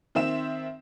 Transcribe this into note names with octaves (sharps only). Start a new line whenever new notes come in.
D#3 C4 E5 E7